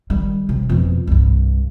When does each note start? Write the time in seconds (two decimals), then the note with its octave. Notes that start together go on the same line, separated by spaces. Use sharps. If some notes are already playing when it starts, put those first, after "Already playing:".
0.10 D#3 G3
0.49 C3
0.69 F2 B2
1.07 C2 G2